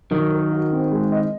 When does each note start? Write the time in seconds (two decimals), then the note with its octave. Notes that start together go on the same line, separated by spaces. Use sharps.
0.11 D#3 F#3
0.31 A#4
0.52 F#4
0.72 C4
0.92 G#3
1.12 D#5